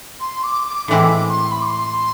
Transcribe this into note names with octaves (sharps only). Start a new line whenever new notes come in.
C6
D6
D6
A2 E3 G#3 C4 E4 D6
D6
C6
B5
D6
C6